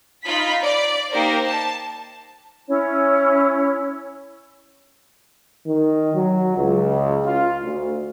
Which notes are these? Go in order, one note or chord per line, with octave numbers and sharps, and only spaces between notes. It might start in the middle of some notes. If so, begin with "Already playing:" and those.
D#4 F4 B5 B6
D5
A#3 D#4 G4 A#4 C5
A5
C#4 E4 C#5
D#3
F#3
C#2
F4
D2